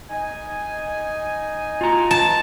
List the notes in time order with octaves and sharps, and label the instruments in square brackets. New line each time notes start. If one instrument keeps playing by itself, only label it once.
[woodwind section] D#4 D#5 G#5
[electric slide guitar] F4 A#5
[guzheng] A5